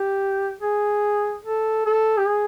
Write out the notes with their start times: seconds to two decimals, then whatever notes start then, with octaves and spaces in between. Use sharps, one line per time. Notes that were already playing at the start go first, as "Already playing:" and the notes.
Already playing: G4
0.61 G#4
1.44 A4
1.86 A4
2.18 G4
2.27 G#4